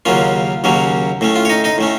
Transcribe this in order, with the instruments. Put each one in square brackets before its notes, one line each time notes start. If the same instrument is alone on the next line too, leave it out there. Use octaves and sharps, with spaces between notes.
[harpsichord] D#2 C#3 F#3 A#3 C#4 F4
D#2 C#3 F#3 A#3 C#4
A2 A3 C#4
F4
C#5
D#4 D#5
D#4 D#5
A2 A3 C#4